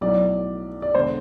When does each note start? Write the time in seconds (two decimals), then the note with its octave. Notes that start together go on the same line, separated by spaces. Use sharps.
0.01 B1 A2 F#3 D5
0.82 D5
0.95 E1 D3 C5